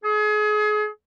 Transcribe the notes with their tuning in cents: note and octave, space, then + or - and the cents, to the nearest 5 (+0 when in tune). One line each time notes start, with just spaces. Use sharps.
G#4 +30